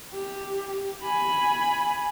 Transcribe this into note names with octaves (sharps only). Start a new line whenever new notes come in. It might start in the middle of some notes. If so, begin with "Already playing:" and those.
G4
G#5 B5